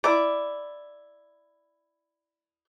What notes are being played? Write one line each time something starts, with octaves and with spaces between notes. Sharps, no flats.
E4 D5